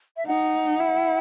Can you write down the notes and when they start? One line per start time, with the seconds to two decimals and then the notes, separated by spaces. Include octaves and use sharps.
0.17 E5
0.26 D#4 F#5
0.80 E4